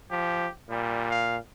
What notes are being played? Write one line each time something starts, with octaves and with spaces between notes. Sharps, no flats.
F3 G4
A#2 G3
F5